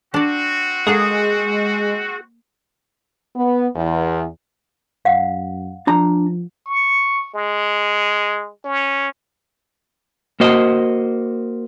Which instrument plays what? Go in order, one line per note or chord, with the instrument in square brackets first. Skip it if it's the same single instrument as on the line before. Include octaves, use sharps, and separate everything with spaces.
[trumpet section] C4 F#4 [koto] D4 D5
[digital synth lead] G#3 [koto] A#3 A4 F#5 [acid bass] G#4
[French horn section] B3
E2
[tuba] F#2 [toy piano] F5 F#5
[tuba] F3 [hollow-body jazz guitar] D4 A#5
[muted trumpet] C#6
G#3
C#4
[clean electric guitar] A#3 F#4 C5 D#5